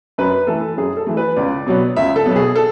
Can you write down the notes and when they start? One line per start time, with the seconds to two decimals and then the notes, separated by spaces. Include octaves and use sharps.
0.18 F#2 B4
0.47 E3 A3 A4
0.77 F#2 G#4
0.97 A4
1.06 E3 A3
1.17 B4
1.36 C#2 D5
1.67 B2 F#3 B3
1.96 C#2 E5
2.16 A4
2.26 B2 F#3 B3
2.36 G#4
2.56 A4